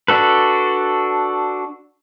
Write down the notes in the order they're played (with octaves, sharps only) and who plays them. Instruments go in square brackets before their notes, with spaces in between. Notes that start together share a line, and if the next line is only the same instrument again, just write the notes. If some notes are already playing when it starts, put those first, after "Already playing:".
[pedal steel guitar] D4 F#4 A4 B4